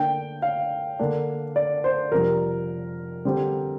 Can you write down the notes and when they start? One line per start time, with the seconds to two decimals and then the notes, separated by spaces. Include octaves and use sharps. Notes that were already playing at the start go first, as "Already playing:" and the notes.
Already playing: D3 A#3 D4 G5
0.42 F5
0.99 D3 A#3 D4
1.56 D5
1.84 C5
2.12 F2 C3 G3 A#4
3.25 D3 G3 C4